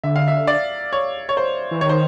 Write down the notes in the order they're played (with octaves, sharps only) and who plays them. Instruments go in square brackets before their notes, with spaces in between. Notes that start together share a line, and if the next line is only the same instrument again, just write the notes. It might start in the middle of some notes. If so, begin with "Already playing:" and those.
[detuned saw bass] D3 [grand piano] E5
[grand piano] F5
E5
D5
C#5
C#5
C5
[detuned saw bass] E3
[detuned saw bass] D#3 [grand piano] C#5
[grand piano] C5